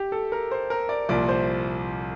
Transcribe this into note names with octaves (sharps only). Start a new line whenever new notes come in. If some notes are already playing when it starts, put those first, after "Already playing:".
Already playing: G4
A4
A#4
C5
A#4
D5
C2 A#2 F3 D5
C5